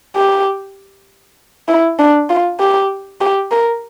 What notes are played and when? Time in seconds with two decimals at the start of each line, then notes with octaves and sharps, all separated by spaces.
0.16 G4
1.68 E4
1.99 D4
2.30 F4
2.60 G4
3.21 G4
3.51 A#4